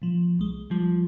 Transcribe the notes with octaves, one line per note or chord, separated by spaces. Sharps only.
A#2 F3
C2 G#3
F3 G3